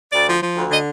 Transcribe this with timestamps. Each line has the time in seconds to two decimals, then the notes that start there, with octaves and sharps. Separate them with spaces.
0.12 D2 D5
0.28 F3
0.42 F3
0.56 D2
0.71 D3 D#5